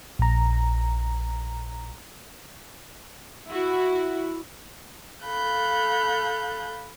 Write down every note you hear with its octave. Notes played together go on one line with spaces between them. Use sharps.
A#1 A#5
E4 F#4
A4 F5 B5 F#6 G6